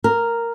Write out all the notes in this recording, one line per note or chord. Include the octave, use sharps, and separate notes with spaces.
A#4